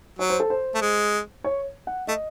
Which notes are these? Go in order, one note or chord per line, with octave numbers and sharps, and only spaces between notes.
F#3 C#5
C5
A4
C5
A3
G#3
C#5
F#5
A3 D#5